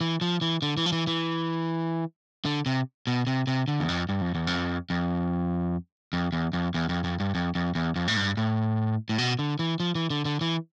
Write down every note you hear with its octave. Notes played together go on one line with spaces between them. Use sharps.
E3
F3
E3
D3
E3
F3
E3
E3
D3
C3
B2
C3
C3
D3
E2
F2
G2
F2
E2
F2
F2
F2
E2
F2
E2
F2
F2
G2
F2
F2
E2
F2
A2
G2
A2
A2
B2
D3
E3
F3
E3
D3
D3
E3